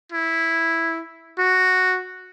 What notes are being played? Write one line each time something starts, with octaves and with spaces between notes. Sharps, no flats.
E4
F#4